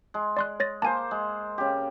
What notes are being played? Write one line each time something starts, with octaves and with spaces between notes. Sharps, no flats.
G#3
D5 C6 F#6
C#5 A6 A#6
A#3 C5 G#5 A5
G#3
C#3 G4